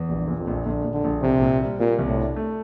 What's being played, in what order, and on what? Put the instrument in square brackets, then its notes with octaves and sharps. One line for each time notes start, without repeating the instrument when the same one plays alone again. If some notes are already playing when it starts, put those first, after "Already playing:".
Already playing: [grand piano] E2
[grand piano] A#1 [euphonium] G2
[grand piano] A#2
[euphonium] F2
[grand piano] A#1
[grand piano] A#1 [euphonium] D3
[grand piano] A#1
[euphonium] D3
[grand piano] A#1
[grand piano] C2 [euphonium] C3
[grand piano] A#2
G3
[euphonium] A#2 [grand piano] G3
[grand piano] C2
[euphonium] A2
[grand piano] D4
A3